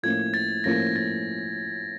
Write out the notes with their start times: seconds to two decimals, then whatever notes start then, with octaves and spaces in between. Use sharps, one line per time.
0.03 A2 F3 A#3 C#4 G#6
0.34 A6
0.64 A2 F3 A#3 C#4 A#6
0.96 A6